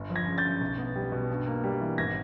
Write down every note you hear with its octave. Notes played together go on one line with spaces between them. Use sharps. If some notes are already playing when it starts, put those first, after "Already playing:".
Already playing: G1
F3
G#6 A#6
C#3
G6 A6
F#2
B1
B3
G3
B2
G2
A#3
G3
E3
G#1 G#6 A#6